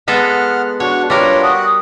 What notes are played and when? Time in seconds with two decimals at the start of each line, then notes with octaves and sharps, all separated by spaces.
0.08 G#3 B3 A4 F#5 F6
0.80 D4 F#4 C#5 F#5
1.10 G3 D4 F4 A#4 B4 C#5
1.43 F#4 F#5 D#6